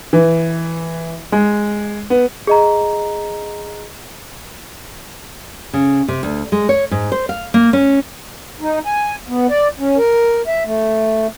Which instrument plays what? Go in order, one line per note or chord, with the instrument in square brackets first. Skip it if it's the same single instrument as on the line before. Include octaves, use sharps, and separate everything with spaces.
[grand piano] E3
G#3
B3
[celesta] G#4 D#5 A#5
[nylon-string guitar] C#3
C3
D2
G#3
C#5
G#2
C5
F5
A#3
C#4
[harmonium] D#4
G#5
B3
D5
C#4
A#4
E5
A3